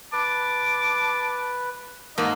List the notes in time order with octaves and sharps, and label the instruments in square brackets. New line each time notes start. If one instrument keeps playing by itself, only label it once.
[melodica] B4 [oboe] A5 [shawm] D6
[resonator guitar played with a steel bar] G#2 A#3 [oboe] D#5 [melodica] A5 A#5 D#6